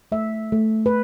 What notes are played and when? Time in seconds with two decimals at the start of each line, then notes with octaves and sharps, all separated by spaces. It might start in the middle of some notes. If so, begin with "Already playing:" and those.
0.12 A3 E5
0.52 A3
0.86 B4